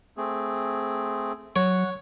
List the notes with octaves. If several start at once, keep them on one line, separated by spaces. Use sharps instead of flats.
A3 C4 G#4
F#3 C#5 F#5